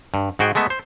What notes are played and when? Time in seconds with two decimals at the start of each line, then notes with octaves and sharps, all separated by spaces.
0.14 G2
0.39 G#2 F#4 G#4 G5
0.55 G#3 A3 B3 E5
0.70 C5